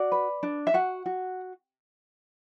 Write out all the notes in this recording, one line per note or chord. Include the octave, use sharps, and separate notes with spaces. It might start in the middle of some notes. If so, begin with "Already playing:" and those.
Already playing: F#4 D5
B4
D4
E5
F#4 F#5
F#4